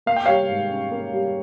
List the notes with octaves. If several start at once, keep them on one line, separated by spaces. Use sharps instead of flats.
A#3 F5
G5
G3 C#5 F5
G#2
C#4
A#3
G3